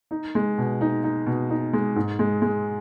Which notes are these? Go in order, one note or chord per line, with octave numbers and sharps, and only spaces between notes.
D#4
G#3
B2
D#4
D#4
B2
D#4
G#3
G#2
G#3
G#3